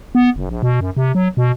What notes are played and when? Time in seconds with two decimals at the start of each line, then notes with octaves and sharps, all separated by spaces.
0.15 B3
0.36 F#1
0.49 A#1
0.63 B2
0.81 F#2
0.97 C3
1.15 F#3
1.37 B2